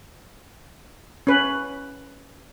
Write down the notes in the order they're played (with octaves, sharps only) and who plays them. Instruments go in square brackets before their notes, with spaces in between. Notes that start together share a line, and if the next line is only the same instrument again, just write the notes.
[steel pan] C#4 B4